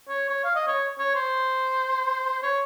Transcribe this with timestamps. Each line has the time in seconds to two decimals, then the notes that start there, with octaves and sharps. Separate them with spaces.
0.09 C#5
0.29 C#5
0.44 F5
0.55 D#5
0.67 C#5
0.99 C#5
1.15 C5
2.43 C#5